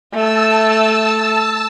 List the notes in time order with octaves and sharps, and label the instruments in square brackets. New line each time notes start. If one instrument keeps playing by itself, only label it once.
[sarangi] A3 [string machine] A5 E6